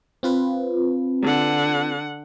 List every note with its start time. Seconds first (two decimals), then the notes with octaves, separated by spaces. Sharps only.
0.23 C4 F4 B4
1.22 D3 F#5